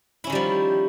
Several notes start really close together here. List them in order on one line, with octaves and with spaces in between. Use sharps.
E4 C#4 D#3 G3 F3